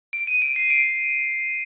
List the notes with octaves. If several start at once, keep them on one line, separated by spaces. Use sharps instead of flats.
D7
D#7
D7
C7
D7